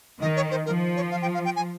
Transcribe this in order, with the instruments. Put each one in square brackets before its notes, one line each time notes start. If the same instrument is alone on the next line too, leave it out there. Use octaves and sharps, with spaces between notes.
[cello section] D#3 [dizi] D#5
[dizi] C#5
C5
[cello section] F3 [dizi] A#4
[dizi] C#5
F5
G5
F5
G5
G#5